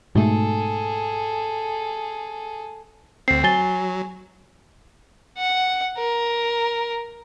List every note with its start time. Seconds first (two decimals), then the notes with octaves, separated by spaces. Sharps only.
0.15 G#2 B2 A3 G#4 A4
3.28 D2 C4 C7
3.44 F#3 G#5 A6 G7
5.38 F#5
5.98 A#4